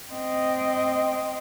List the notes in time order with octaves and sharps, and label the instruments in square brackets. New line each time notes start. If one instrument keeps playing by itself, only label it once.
[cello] C4 D#5